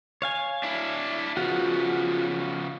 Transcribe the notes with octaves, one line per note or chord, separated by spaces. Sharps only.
C#5 F5 G#5
D4 E4
C#3 F3 B3 F4 F#4